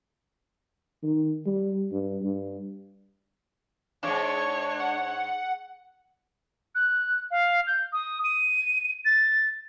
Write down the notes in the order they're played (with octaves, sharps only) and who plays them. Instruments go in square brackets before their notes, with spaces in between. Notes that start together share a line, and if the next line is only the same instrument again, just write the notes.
[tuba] D#3
G3
G2
G2
[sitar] E2 G#2 [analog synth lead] D4 [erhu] C#5
[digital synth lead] F#5
[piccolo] F#6
F5
G6
D#6
D#7
A6